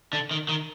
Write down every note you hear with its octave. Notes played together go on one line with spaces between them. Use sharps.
D3
D#3
D#3